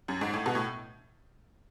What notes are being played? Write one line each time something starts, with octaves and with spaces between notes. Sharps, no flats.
F#2
G#2
A2
B2
A2